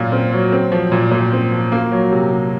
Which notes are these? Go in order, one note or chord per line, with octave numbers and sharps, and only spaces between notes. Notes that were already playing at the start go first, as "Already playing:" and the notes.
Already playing: A#2 F#3 F4
C4
F#3
C4
F3
A#2
A#2
C4
F3
A#3
F#3
C3
C3